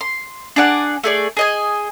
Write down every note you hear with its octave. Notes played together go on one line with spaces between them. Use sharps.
C6
D4 G#4 D5 F#5
A3 G#4 D5
G#4 D#5 G#5